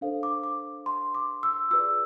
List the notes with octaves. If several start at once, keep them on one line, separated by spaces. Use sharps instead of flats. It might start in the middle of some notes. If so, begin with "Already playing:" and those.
D4 A4 C5 F5
D6
D6
C6
D6
E6
F4 G#4 B4 D5 E6